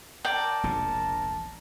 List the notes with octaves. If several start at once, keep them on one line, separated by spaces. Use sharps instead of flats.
A#4 D5 G5 A5
E1 A#1 C3